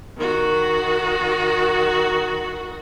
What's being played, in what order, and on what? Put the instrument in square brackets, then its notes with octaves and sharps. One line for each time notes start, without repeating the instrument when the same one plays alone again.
[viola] D#3 F#4